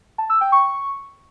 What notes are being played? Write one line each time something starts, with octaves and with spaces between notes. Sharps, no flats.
A5
E6
G5
C#6